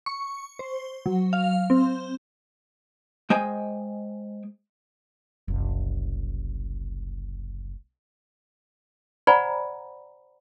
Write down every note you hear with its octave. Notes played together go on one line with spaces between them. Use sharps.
C#6
C5
F#3
F5
C4
G#3 C5 D#5 G5 G#5
F#1 C2
C5 D5 F#5 G#5 A#5 B5